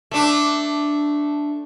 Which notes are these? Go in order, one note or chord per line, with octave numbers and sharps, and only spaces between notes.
A3 D4